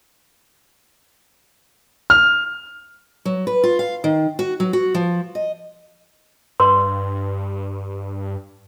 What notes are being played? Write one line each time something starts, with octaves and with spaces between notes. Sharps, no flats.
F6
F#3
B4
F4
F5
D#3
F#4
F#3
F#4
F3
D#5
G2 B4 C6